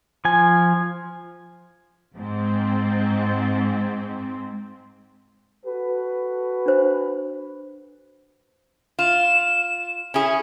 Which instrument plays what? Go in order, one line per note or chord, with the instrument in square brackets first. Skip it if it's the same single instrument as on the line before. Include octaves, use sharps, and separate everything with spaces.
[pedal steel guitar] F3 G#5
[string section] G#2 C4
[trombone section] F#4 A4 B4
[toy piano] D4 C5
[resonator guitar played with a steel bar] F4 [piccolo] E7
[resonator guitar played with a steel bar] C#4 E4 G#4